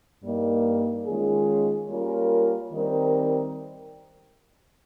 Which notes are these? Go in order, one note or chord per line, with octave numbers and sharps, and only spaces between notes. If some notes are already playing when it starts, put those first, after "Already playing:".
G2 G3 A#3 D#4
D#3 G#3 C#4 F4 G#4
G3 A#3 C#4 F4 A#4
D#3 G3 C4 D#4 A#4